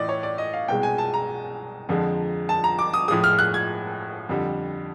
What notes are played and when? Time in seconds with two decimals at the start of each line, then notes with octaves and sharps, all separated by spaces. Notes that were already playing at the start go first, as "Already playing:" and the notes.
Already playing: A2 E3 A3 D5 D#5
0.09 C#5
0.23 D5
0.38 D#5
0.54 F5
0.68 C2 B2 G#3 G5
0.83 G#5
0.98 A5
1.14 A#5
1.89 F2 D3 F3 G#3
2.49 A5
2.64 A#5
2.79 D6
2.93 D#6
3.08 A2 F3 G#3 D#6
3.24 F6
3.39 F#6
3.54 G#6
4.29 F2 D3 G3